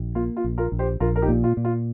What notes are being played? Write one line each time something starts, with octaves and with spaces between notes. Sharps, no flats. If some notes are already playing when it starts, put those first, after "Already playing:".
Already playing: A#1
A#3 F4
F4
A#1
F4 A#4
A#1
G4 C5
A#1 F4 A#4
A#4
D#4 G4
A#2
F4
A#2
F4